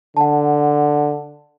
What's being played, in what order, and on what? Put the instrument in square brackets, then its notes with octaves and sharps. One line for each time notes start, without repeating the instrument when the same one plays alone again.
[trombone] D3 [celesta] F#5 A5